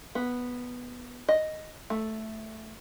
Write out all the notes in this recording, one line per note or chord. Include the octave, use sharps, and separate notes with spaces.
B3
D#5
A3